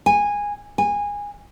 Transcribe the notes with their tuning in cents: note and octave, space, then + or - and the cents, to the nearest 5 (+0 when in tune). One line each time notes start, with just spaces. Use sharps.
G#5 -15
G#5 -20